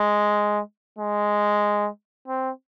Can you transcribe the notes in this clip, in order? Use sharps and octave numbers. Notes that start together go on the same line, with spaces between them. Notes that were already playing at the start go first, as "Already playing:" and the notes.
Already playing: G#3
G#3
C4